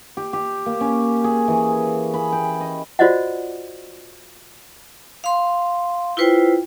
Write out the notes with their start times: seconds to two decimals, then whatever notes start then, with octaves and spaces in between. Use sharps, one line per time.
0.17 G4
0.33 G4
0.66 A#3
0.81 C#4
1.24 G#4
1.48 E3
2.14 B5
2.32 G5
2.61 D#5
2.99 F4 F#4 C5 D5 D#5 F#5
5.24 F5 C6
6.17 E4 F4 B4 C5 G5